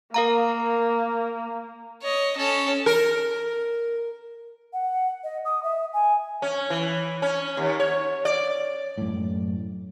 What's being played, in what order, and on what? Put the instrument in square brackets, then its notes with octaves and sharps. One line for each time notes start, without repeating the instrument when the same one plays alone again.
[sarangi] A#3 [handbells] A#4 F5 A#5
[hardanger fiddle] C#5 D#5
C#4 A4
[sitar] A#4
[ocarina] F#5
D#5
D#6
E5
G#5
[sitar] C#4
E3
C#4
D#2
C#5
D5
[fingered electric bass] F#2 A2